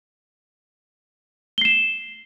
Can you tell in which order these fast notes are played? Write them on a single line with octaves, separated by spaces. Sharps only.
G7 C7 E7